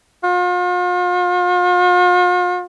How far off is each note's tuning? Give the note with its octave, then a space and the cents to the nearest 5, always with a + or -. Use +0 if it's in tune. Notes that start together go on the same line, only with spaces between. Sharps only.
F4 +45